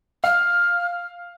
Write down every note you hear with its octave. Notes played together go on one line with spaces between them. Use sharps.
F5 F6